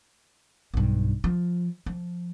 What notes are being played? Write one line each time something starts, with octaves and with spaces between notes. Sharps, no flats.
B1 G2
F3
F3